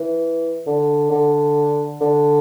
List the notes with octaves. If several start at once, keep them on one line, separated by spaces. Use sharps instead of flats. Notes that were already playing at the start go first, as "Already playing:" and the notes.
Already playing: E3
D3
D3
D3